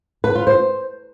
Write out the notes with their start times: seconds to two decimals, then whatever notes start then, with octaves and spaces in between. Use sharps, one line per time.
0.24 B4
0.35 F4
0.47 C5